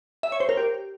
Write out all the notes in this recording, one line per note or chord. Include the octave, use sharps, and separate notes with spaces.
E5
C#5
C5
A#4
G4